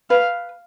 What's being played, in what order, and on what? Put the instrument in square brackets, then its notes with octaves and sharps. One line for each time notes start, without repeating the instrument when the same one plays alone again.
[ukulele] B4 [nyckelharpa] F5